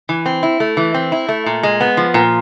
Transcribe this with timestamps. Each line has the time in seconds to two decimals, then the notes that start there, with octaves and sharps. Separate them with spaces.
0.09 E3
0.26 C4
0.43 E4
0.60 A3
0.77 E3
0.94 C4
1.12 E4
1.29 A3
1.46 A#2
1.63 G#3
1.80 B3
1.97 F3
2.14 A#2